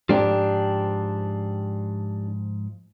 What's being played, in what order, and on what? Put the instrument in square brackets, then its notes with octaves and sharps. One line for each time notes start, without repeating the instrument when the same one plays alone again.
[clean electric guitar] G#2 F3 [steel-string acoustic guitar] D4 G4